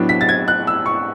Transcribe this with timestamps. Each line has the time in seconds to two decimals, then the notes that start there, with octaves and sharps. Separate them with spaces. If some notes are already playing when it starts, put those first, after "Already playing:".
Already playing: A2 F#3 B3 D4
0.09 B6
0.21 A6
0.29 G#6
0.48 F#6
0.67 E6
0.86 C#6